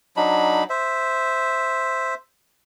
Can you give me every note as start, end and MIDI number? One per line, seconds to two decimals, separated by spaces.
0.17 0.64 54
0.17 0.64 62
0.17 0.64 63
0.17 0.64 83
0.70 2.14 72
0.70 2.14 76